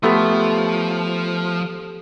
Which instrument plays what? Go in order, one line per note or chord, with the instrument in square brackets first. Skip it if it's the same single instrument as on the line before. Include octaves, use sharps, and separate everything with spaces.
[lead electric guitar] F3 [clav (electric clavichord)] A3 B3 [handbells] G4 A4 C6